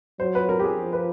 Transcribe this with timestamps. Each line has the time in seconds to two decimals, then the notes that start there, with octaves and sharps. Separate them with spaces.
0.20 F#3 C5
0.35 B4
0.49 A#4
0.60 G4
0.64 G#4
0.78 F3
0.93 B4